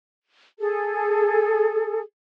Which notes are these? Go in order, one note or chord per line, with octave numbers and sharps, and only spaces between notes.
G#4 A4